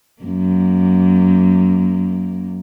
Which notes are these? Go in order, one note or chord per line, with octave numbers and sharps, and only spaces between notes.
F#2 A#3